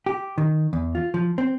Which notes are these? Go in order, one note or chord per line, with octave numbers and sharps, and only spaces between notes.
G4
D#3
E2
F4
F3
C4